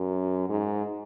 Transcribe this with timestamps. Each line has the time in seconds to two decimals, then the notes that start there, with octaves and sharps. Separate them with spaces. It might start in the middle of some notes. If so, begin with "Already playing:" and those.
Already playing: F#2
0.49 G#2